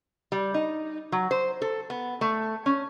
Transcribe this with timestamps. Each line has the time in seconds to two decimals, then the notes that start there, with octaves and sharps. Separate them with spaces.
0.32 G3
0.54 D#4
1.12 F#3
1.31 C5
1.62 A4
1.90 B3
2.21 A3
2.66 C#4